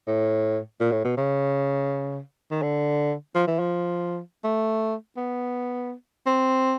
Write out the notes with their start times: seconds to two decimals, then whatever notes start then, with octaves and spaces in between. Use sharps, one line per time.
0.07 A2
0.80 A#2
0.92 A2
1.04 B2
1.17 C#3
2.51 D#3
2.62 D3
3.35 F3
3.47 E3
3.59 F3
4.44 A3
5.17 B3
6.26 C4